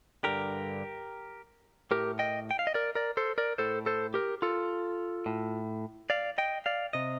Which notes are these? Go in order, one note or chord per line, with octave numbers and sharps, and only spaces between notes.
G2 D3 G4 A#4
A2 G4 A#4
D#5 G5
G5
F5
D#5
A#4 D5
A#4 D5
A4 C5
A#4 D5
A2 A4 C5
A4 C5
G4 A#4
F4 A4
A2
D5 F5
D#5 G5
D5 F5
C3 D#5